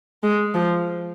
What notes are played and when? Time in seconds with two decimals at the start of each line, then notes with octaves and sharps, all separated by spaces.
0.23 G#3
0.54 F3